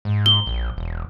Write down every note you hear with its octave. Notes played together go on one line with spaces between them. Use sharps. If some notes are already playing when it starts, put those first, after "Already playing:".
G#2
G7
A#1
E1